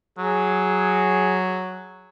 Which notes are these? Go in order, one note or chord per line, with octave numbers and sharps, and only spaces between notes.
F#3 G#4